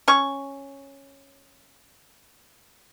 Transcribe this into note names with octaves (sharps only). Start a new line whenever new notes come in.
C#4 C#6